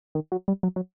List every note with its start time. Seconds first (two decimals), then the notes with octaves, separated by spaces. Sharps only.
0.15 D#3
0.32 F#3
0.48 G3
0.63 F#3
0.76 F#3